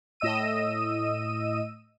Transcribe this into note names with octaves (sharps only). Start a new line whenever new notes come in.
A2 D#5 E6 D#7